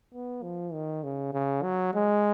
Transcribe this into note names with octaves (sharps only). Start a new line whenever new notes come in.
B3
F3
D#3
C#3
C#3
F#3
G#3